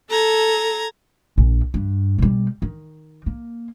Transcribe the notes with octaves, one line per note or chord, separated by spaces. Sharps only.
A4 A#5 G#6
A#1
G2
B2 G3
D#3
A#3